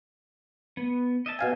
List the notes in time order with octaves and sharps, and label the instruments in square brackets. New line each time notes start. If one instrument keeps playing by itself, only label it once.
[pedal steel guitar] B3
D#5 E5 A5
[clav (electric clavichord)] B2 F5 G#5